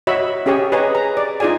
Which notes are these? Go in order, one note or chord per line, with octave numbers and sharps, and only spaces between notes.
F#4 C#5 D#5 E5 B5 E6
C#4 G4 G#4 C#5 G#5
G#4 B4 C#5 D#5 G#5 A#5
A#5
D5
D#4 F4 G#4 D5 G#5